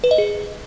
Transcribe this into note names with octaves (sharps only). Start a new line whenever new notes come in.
B4
D#5
G#4